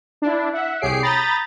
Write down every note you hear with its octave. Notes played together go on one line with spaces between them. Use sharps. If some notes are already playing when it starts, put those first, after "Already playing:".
D4 E4
E5 F#5
C2 G4 G#4 C#5 C7 D7
A#5 B5 D#6 G6 A6